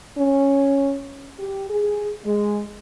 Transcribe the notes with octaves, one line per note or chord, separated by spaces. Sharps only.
C#4
G4
G#4
G#3